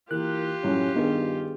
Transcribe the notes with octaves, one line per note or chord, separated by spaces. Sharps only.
E3 A#3 F4 G4 A#4 F#6
F#2 A2 C#4
G2 D#3 B3 D4 G#4